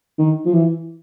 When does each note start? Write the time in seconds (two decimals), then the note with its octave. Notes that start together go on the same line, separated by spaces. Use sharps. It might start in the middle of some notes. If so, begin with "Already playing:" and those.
0.18 D#3
0.45 F3
0.53 E3